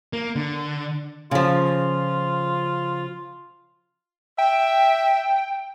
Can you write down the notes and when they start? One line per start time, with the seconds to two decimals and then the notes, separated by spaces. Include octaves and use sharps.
0.13 A#3
0.36 D3
1.31 C#3 F3 F4
4.38 E5 G5